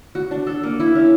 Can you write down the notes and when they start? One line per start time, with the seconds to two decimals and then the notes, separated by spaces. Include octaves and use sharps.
0.15 F#4
0.31 D4
0.47 A4
0.63 A#3
0.80 E4
0.95 C#4